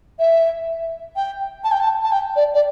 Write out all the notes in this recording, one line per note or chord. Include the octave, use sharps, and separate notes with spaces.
E5
G5
A5
G5
A5
A5
G5
D5
D5